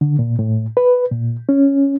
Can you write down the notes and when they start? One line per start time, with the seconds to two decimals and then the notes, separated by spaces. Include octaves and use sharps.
0.01 D3
0.19 A#2
0.39 A2
0.77 B4
1.11 A#2
1.49 C#4